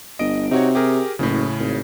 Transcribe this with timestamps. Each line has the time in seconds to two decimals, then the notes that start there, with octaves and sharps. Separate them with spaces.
0.19 G1 D#5 D7
0.51 C3 D#4 F#4 C#5
0.75 G4 G#4 A#4
1.19 F#1 A2 C#3
1.60 G#1